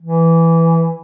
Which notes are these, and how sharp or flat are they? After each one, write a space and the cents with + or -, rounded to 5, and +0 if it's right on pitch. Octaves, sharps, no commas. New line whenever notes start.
E3 +5